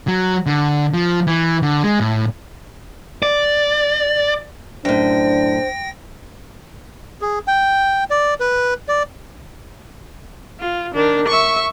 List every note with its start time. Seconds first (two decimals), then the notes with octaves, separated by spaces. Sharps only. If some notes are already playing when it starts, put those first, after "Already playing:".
0.08 F#3
0.46 D3
0.93 F3
1.27 E3
1.62 D3
1.84 G#3
2.00 A2
3.23 D5
4.85 F#2 A2 D4 C5 G5 A#6
7.22 G#4
7.47 G5
8.11 D5
8.40 B4
8.88 D5
10.60 F4
10.94 D#3 D4
11.28 E5 C#6